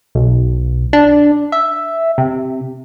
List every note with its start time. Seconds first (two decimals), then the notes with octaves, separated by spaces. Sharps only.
0.15 B1
0.93 D4
1.52 E5
2.18 C3